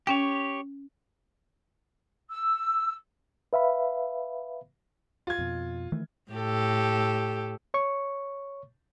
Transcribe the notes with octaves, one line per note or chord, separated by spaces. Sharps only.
C#4 G4 C#5 G5
E6
B4 E5 F5 B5
F4 G#6
F2 B2
D#3 E3 A3
A2 G4 A4
C#5 C#6